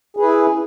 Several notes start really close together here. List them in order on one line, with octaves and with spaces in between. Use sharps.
G#4 B4 E4